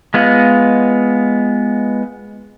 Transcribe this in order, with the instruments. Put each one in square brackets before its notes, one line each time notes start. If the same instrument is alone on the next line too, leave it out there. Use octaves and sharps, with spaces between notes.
[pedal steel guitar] G#3 B3 F4 D#5 F#5